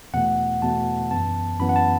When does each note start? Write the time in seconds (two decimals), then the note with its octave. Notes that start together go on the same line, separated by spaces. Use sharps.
0.14 E2 B2 A3 F#5
0.62 E2 B2 A3 A5
1.11 F#2 E3 B3 A5
1.59 F#2 E3 B3 B5
1.69 F#5
1.76 A5